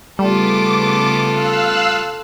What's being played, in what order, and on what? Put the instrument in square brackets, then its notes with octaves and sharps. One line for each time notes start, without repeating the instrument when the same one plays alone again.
[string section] C#3 A3 B3 [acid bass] G3 [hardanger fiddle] F4 A4 [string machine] D6
[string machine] F5 E6 F#6